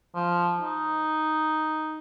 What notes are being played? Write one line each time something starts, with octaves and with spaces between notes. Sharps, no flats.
F3
D#4